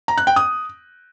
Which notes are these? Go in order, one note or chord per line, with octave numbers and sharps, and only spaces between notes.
A#5
F#6
G5
D#6